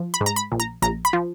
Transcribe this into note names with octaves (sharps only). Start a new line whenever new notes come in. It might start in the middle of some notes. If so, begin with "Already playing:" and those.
Already playing: F3
B5
G#2
A#5
B5
A#1
A#5
A#1 A#5
B5
F3